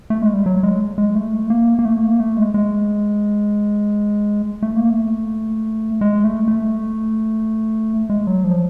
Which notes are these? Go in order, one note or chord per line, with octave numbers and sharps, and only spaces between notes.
A3
G#3
G3
F#3
G#3
G#3
A3
A#3
A#3
A3
A#3
A3
G#3
G#3
A3
A#3
A3
G#3
A3
A3
G#3
F#3
F3